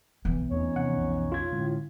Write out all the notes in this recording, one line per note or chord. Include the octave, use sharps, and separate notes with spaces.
B1 E3 B3
E2 A3 C4 C#4 D#4 C#5
C3 F3 C4 F#5
B1 F2
F4 G#6
A2 D3 G#3 C#4